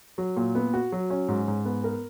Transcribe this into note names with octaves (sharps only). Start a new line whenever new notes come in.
F#3
A#2
B3
F#4
F#3
C#4
G#2
G#2
B3
A#4